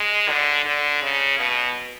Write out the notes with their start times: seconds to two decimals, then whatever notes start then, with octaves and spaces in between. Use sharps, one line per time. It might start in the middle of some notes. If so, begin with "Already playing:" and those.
Already playing: G#3
0.29 D3
0.65 D3
1.03 C#3
1.40 B2